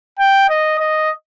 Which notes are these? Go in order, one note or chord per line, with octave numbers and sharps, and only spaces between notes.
G5
D#5
D#5